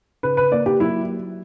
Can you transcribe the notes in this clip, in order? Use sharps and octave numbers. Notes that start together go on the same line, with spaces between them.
C#3 B4
B4
A#3 D5
G4
F#3 E4